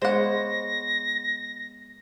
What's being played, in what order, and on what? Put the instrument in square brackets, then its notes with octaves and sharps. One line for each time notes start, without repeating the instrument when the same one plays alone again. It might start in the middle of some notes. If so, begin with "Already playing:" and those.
[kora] G#3 B3 C#5 [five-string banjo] C5 F#5 [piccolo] A#6